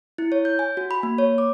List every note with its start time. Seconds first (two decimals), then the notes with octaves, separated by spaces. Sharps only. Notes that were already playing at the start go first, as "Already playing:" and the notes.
0.18 E4
0.32 C#5
0.45 G6
0.59 G#5
0.77 F#4
0.91 B5
1.03 A#3
1.18 C#5
1.38 D6